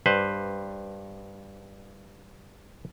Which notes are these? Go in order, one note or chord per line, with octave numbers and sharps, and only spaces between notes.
G2 B4 C5